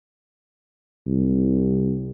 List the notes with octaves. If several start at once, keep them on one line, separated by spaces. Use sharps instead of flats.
C2